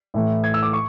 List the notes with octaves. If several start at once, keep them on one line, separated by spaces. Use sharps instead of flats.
A2 E3 A3
G#6
E6
D6
C#6